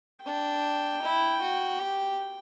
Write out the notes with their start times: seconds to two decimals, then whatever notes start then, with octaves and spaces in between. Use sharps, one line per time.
0.24 D4 G5
1.02 E4
1.41 F#4
1.79 G4